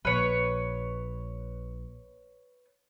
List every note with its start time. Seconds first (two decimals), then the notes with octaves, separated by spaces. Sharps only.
0.05 A#1 B4 C#5